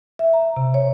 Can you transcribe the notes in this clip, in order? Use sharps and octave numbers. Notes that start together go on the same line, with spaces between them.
E5
A#5
C3
C#5